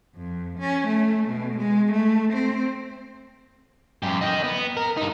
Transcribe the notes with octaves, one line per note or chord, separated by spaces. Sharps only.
F2
C#4
A3
B2
G#3
A3
C4
F#2 G4
D#5 G5
B3
A#4
G2 D#4